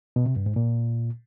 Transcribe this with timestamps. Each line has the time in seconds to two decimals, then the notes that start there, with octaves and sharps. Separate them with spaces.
0.16 B2
0.26 C3
0.36 G2
0.46 G#2
0.56 A#2